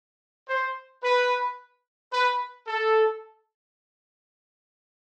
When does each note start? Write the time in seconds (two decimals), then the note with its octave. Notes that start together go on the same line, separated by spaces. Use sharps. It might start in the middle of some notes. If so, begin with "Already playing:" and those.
0.49 C5
1.03 B4
2.13 B4
2.67 A4